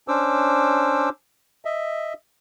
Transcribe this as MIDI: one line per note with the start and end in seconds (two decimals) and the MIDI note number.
0.08 1.09 61
0.08 1.09 62
0.08 1.09 72
0.08 1.09 86
0.08 1.09 88
1.65 2.13 75
1.65 2.13 76